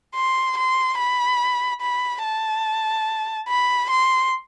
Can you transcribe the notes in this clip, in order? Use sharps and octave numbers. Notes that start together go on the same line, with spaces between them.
C6
C6
B5
B5
A5
B5
C6